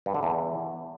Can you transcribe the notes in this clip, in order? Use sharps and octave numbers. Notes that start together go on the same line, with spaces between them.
G2
D3
E2